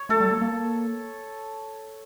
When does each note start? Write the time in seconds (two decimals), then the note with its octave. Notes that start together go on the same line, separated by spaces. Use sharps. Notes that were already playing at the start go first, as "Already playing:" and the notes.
Already playing: C#5
0.09 A3 A4
0.20 G3
0.31 A#3
0.42 A#3